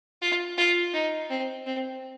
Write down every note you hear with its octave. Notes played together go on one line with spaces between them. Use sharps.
F4
F4
D#4
C4
C4